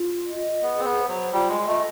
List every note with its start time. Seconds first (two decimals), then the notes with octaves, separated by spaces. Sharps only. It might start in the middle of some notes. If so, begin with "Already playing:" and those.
Already playing: F4
0.27 D#5
0.62 B3 G#4
0.79 C4
0.85 B3
0.97 C5
1.09 F#3
1.32 G3 F4
1.49 G#3
1.67 A3 D#5